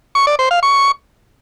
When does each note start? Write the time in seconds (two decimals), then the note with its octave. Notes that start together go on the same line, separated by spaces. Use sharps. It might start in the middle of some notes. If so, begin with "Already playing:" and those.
0.15 C#6
0.27 D5
0.39 C5
0.51 F5
0.63 C#6